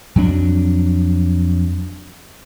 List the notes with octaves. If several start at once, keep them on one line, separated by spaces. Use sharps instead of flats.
F2 F#3 D4